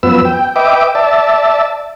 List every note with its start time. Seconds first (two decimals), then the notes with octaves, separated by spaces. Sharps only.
0.03 F#2 F3 B3 B4 E6
0.25 G5
0.56 B4 D#5 E5 G5 D6
0.95 D5 E5 A5